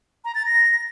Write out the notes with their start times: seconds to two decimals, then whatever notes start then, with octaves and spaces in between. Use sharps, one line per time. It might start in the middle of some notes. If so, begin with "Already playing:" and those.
0.25 A#5
0.35 A6
0.45 A#6